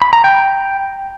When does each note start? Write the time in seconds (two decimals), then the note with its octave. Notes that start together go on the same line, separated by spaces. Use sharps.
0.02 B5
0.13 A#5
0.24 G5